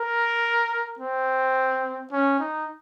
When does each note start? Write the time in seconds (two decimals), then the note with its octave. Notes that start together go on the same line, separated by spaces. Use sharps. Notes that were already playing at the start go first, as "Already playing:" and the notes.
Already playing: A#4
0.99 C4
2.12 C#4
2.40 D#4